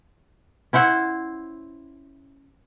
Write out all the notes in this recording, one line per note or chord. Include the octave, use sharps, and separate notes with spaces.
C#4 E4 C5 F#5